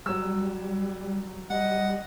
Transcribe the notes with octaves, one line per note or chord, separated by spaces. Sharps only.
F#3 G3 E6
G3 D#5 F#5